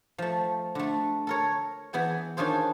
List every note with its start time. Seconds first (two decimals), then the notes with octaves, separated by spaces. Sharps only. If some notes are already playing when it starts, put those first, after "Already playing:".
0.18 F3 A3
0.75 D3 A3
1.27 A4 A#4 C#5
1.93 E3 B3 G#4 G5
2.37 D#3 C#4 D4 F4 G#4 C5